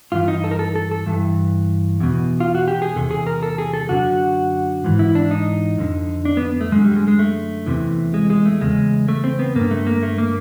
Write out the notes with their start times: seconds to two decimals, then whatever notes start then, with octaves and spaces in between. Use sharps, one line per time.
0.12 G2 E3 F4
0.28 D#4
0.44 A4
0.51 A#4
0.59 A4
0.76 A4
0.91 A4
1.06 G2 E3
2.00 E2 B2
2.40 F4
2.55 F#4
2.68 G4
2.82 G#4
2.95 E2 C3 A4
3.11 G#4
3.27 A#4
3.43 A4
3.58 G#4
3.74 A4
3.89 F#2 D3 F#4
4.84 G#2 E3
4.99 E4
5.15 D4
5.31 D#4
5.78 F2 D3
6.25 D4
6.37 B3
6.61 A3
6.72 F#2 D3 G#3
6.84 G3
6.96 G#3
7.08 G#3
7.19 A3
7.66 E2 C3 E3
8.14 G#3
8.30 G#3
8.46 A3
8.61 E2 C#3 G#3
9.08 A3
9.24 C4
9.39 B3
9.55 G2 D3 A#3
9.71 A3
9.87 A#3
10.03 A3
10.18 A#3